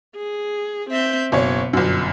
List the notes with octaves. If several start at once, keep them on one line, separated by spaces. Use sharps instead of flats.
G#4
C4 E5 G6
F#1 B2 C#5
G1 F#2